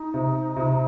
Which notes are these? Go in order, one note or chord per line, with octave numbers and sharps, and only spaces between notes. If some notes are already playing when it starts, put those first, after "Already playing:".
Already playing: D#4
C3
C3